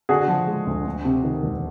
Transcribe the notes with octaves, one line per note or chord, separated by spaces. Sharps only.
D3 F#4 G#4
F3
G#3
D2
D2
C3
D#3
E1